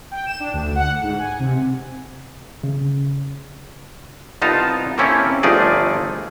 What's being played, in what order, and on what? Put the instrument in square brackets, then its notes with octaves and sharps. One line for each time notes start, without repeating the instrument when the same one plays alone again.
[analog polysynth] G5
E7
D4
D2
F#5
G#2
G#5
C3
[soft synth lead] C#3
[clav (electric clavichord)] C2 B3 D#4 F4 A5 A#5
A#3 C4 C#4 E4 G4 A4
G1 F3 A3 D#4 G#4 D5